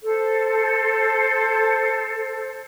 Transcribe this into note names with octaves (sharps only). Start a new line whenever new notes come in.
A4 C5